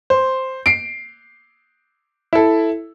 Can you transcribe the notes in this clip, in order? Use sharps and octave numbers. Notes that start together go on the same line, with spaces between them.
C5
C7 D7
E4 A4